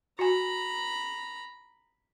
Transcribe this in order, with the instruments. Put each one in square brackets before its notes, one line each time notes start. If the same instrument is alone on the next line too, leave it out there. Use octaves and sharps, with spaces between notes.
[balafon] F#4 G#5 [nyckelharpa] A#5 B5